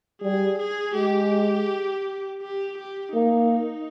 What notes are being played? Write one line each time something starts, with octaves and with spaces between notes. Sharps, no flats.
G3 G#4
G#4
G#3 G4
G4
G4
A#3 D#4